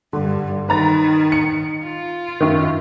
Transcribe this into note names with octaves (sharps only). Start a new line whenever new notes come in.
G2 D3
D#3 B4 A#5 A6
C#7
F4
F#2 D#3